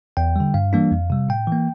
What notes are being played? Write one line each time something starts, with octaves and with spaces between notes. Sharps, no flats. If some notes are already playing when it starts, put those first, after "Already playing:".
E2 G5
D3 G3
G2 F5
E3 G3 A#3 D4
F2
C3 G3
A2 G5
E3 A#3